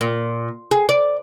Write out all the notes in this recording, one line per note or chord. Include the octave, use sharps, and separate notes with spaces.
A#2
G#4
D5